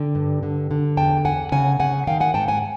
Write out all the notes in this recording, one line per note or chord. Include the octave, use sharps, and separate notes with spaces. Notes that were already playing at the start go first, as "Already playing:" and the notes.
Already playing: D3 G5
G2
D3
D3
E2 G5 A5
E2 F#5 G#5
C#3 F#5 G#5
C#3 F#5 G#5
D#3 F5 G5
F#5 G#5
G#2 G5 A5
F#5 G#5